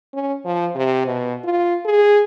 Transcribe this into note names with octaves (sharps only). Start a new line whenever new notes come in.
C#4
F3
C3
B2
F4
G#4